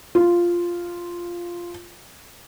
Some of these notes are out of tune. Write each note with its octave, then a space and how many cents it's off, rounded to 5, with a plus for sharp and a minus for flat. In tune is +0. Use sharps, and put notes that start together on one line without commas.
F4 -5